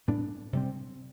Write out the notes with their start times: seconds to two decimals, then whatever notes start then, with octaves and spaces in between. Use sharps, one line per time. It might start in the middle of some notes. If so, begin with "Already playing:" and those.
0.08 A2 G3 B3 D4
0.53 C3 G3 C4